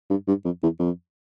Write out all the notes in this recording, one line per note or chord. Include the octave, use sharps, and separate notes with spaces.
G2
G2
F2
E2
F2